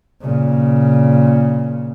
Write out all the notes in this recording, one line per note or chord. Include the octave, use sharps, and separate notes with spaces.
A#2 C#3